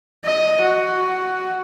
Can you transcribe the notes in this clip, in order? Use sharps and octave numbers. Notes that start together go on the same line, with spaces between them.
D#5
F#4